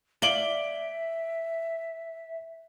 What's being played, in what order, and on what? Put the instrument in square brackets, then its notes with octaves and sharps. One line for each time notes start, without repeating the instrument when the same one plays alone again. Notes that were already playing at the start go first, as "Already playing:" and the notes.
[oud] D5 F5 [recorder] E5 [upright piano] D7 F#7 G7